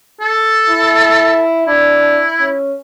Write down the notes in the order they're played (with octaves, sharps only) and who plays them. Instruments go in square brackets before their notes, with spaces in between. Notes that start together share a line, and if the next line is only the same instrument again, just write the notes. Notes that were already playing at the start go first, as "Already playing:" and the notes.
[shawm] A4
[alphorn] E4
[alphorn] D4 [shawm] E4
[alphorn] C#4